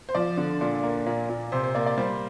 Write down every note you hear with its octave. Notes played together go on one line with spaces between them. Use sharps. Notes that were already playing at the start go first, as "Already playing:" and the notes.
C5
F3 D5
D3
A#2
A#3
A#2
A#2
C3 C5
C5
A#3 D5
D5
G3 C5